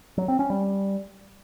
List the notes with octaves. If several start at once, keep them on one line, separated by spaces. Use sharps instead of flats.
F#3
C4
C#4
G3